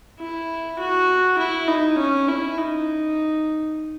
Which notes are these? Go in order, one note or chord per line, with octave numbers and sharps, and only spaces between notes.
E4
F#4
E4
D#4
C#4
E4
D#4